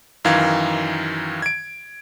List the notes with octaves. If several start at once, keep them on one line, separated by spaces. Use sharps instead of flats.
F#2 D#3 E3 F5 G#6
G#6 D7